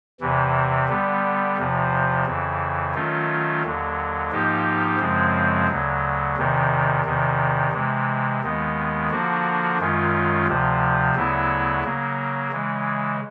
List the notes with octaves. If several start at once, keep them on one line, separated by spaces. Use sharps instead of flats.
E2 C3 E3
D3 G3 B3
E2 C3 F3
F2 C#3 E3
D#3 F#3 A3 C#4 F4
D#2 D3 F#3
G#2 F3 A#3 D#4 G4
F#2 C#3 F3 G#3 C4
D2 C#3 F#3
E2 C3 D#3
E2 C3 D#3
C3 E3 G#3
D#2 D#3 G#3 B3
D3 F3 A#3 D4 F#4
F#2 D#3 G#3 C#4 F4
D2 C3 F3
D2 C#3 F#3 B3 E4
C#3 F#3 A#3
C#3 E3 G#3